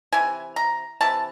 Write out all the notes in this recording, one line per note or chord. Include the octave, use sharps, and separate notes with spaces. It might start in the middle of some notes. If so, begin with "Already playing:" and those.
C3 E3 G#5
A#5
C3 E3 A5